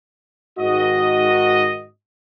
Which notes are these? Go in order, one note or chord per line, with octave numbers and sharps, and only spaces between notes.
G#2 D#3 F#4 D#5